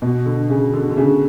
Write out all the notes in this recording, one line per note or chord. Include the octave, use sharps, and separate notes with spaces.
B2
D3
C#3
D3
D3
C#3